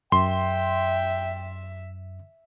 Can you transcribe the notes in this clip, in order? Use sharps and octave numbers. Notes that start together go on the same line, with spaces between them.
F#2 E5 G5 C6